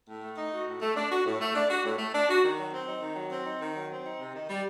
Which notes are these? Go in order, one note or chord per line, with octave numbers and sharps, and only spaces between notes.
A2
A3
D#4
F#4
A2
A3
D4
F#4
A2
A3
D4
F#4
A2
A3
D4
F#4
D#3
F#3
C4
D#4
D#3
F#3
C4
D#4
D#3
F#3
C4
D#4
C3
D#3
G3